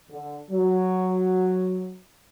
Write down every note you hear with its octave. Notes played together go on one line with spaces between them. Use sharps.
D3
F#3